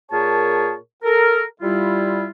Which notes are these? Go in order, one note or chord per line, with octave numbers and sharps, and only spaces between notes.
A#2 G#4 A#4 C#5 A5
A4 A#4
G3 E4 F4